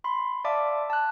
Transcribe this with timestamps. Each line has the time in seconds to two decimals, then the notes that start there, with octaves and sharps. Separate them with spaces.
0.04 B5 C6
0.45 D5 E5 F5 A5 C6 D6
0.90 A5 F#6